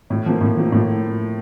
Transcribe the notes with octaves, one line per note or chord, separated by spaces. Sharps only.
A2
F3 A#3
A2
F3 A#3
A2